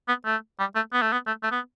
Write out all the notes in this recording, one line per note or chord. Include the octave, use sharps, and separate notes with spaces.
B3
A3
G3
A3
B3
A3
B3
A3
A3
B3